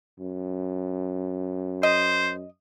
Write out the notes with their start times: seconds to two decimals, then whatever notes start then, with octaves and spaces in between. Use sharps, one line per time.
0.20 F#2
1.83 C5 D#5